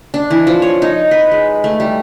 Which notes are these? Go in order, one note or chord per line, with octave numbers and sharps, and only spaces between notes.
D4
E3
F3
C#5
D#4
B4
G#3
A3
G3